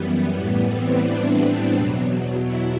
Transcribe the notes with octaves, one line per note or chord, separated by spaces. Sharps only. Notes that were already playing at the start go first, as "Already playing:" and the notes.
Already playing: F#2 E3 G3 B3
A2 E3 G3 B3
C4
D4
E2 B2 F#3
E4